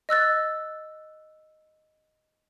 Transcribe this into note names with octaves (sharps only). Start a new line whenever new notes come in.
D#5 E6 F#6 A6